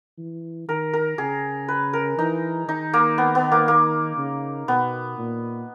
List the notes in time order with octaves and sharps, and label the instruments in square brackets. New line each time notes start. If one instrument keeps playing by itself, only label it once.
[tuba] E3
[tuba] D#3 [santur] A#4
[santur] A#4
[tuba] C#3 [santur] G#4
[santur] B4
A#4
[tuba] E3 [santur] D#4
[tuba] D#3 [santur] D#4
[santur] A#3
B3
B3
A#3
A#3
[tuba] C#3
[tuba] B2 [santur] B3
[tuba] A#2